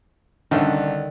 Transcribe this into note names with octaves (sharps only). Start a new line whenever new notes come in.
C2 D3 D#3 C#4 D4